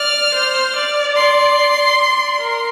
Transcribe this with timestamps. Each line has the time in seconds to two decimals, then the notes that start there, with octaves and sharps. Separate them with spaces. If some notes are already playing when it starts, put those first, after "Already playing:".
Already playing: D5 F6
0.34 C5
0.76 D5
1.16 C6
1.99 D5
2.41 A#4